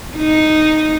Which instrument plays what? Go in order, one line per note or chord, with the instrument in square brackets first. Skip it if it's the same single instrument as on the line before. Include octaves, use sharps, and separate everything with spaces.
[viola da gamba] D#4